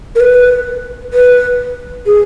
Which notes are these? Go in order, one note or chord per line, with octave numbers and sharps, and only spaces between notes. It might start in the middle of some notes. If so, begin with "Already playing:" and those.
A#4
B4
B4
G#4